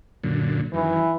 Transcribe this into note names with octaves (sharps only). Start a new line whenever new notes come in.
F#2 A#2 D3
F#2 D#3 E3